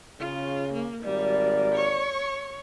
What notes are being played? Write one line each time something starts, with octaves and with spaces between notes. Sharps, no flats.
C#3 F4
A#3
G#1 G3 A#4 D5
C#5 C#6